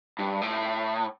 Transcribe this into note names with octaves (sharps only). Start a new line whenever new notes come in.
G2
A2